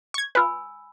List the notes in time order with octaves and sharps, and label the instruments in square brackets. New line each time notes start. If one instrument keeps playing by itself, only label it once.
[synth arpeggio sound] C#6 G#6
[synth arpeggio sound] F4 B4 [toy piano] G#5 B5 E6